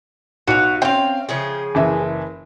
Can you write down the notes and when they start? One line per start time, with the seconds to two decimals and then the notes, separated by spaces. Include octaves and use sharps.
0.47 B1 F#4 F5
0.82 C4 C#4 F5 G5
1.29 C#3 F3 G#4
1.75 F#1 E3 E5